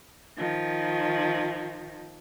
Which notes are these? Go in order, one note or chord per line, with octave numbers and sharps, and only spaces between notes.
D#3 F3